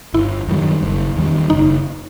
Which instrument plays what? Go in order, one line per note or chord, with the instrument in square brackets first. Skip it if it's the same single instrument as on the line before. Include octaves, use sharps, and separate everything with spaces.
[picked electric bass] G1 [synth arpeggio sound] E4
[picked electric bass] F#2 D#3 G3
F#1
E2 D#3 G3
[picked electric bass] F#1 [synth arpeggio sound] D#4